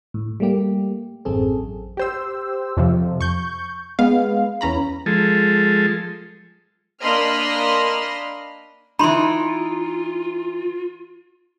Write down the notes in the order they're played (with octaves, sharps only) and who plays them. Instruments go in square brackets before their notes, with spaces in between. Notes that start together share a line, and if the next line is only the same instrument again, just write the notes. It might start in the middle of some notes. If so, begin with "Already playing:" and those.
[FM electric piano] A2
G3 A3 A#3 G4
A1 F#2 C4 G#4 A4
[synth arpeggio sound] G4 C5 E6
F2 C3 F3
C#6 G6
G#3 B3 F5
E2 C#4 A#5 B5
[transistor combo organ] F3 G#3 A4
[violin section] A#3 D4 D#5 B5 C6 F6
[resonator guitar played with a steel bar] E3 D#4 [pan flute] F4 [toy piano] B5 C6